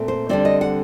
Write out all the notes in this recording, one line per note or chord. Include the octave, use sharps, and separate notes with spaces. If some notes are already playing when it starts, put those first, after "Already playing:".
Already playing: A#2 A3 C4
C5
D3 G3 C4 D5
D#5
F#5